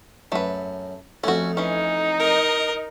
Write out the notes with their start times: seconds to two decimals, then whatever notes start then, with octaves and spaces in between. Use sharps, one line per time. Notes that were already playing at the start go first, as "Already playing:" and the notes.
0.32 F#2 A3 B4
1.24 F2 A3 C#4 F#4
1.57 E3 C#4 D#4
2.19 A#4 D#5